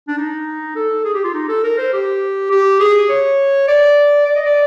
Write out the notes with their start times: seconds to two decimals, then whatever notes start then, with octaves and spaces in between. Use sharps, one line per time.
0.08 D4
0.18 D#4
0.76 A4
1.05 G#4
1.14 G4
1.24 F4
1.34 D#4
1.49 A4
1.64 A#4
1.78 C5
1.93 G4
2.51 G4
2.80 G#4
3.09 C#5
3.68 D5
4.26 D5
4.36 D#5
4.46 D5